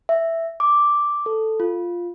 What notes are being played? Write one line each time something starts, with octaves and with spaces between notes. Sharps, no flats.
E5
D6
A4
F4